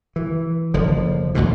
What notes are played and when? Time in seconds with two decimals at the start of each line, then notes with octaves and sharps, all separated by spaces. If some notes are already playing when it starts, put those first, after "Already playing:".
0.16 E3
0.74 F#1 D3 F3
1.35 A1 D2 G#2 B2